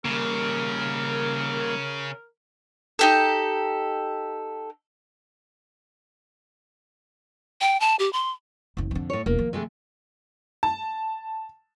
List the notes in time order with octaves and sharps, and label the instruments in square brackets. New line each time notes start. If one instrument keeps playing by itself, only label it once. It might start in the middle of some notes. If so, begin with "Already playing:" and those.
[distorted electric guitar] C#3 [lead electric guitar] G3 A#3 [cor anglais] A#4
[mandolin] D#4 G4 A4
[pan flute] G5
A5
G4
C6
[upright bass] F#1 D#2
F2 D3
[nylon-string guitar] A2 C#5
[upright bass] E1 [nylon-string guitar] A#3
[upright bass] D#3 F3
[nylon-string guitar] C3 G#3 A3
[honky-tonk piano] A5